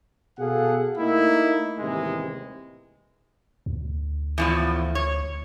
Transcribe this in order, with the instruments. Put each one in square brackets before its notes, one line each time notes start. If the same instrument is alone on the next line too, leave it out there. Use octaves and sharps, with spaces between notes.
[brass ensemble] B2 G#4 A4 F5 F#5
A3 A#3 D#4 E4
A1 D#2 C3 E3 G#3
[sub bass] D2
[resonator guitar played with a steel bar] E2 A2 F3
C#5